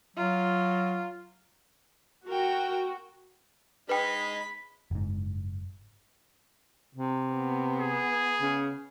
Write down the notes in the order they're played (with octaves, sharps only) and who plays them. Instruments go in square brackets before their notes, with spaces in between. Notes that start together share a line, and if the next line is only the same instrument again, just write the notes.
[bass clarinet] F#3 [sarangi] F4
[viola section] F#4 [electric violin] A#4 G5
[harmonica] G#3 D#4 [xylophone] B4 G5 [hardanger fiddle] B5
[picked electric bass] F#1 G#2
[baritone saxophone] C3
[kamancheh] B3
[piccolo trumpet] G#4
[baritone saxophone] C#3